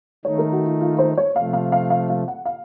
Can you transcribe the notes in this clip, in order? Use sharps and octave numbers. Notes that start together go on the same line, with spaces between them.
D#3 A3 D#4 C#5
A#4
F#4
F4
F4
C5
C#5
C3 F3 A3 F5
F5
F5
F5
F5
F#5
F5